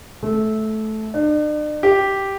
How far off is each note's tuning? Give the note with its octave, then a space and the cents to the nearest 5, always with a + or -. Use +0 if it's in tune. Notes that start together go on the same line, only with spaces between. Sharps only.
A3 -15
D4 +45
G4 -5